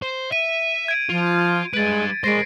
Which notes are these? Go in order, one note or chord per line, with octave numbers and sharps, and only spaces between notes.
C5
E5 D#7
G#6 D7
F3 F4
G3 G#3 B4 A6 D7
G#3 A#4 C5 A#6 C7 D7